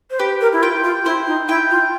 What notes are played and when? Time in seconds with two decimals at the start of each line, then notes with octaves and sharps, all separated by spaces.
0.11 C5
0.19 G4 B4
0.41 A#4
0.53 E4
0.62 F4 G5
0.84 F4
1.05 E4 C5
1.27 D#4
1.48 E4 G5
1.70 F4